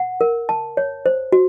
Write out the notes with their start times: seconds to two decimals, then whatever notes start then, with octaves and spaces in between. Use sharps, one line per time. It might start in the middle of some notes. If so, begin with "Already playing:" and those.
Already playing: F#5
0.21 A#4
0.49 A5
0.77 C#5
1.06 C5
1.32 F#4